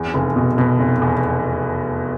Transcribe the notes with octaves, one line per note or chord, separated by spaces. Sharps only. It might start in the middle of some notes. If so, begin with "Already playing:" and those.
Already playing: E2
F1
B2
B2
F1
E2